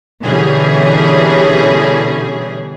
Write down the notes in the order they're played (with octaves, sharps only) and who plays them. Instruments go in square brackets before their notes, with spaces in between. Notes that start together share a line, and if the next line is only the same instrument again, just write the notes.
[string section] B2 D3 E3 G3 C#4 G#4